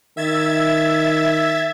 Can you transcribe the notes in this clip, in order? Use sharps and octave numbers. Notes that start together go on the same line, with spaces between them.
D#3 E5 G#6 A6